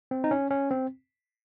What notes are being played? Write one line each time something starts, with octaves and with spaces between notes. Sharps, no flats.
C4
D#4
C#4
C#4
C4